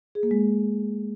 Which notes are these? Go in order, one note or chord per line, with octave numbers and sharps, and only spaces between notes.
G#4
A#3
G#3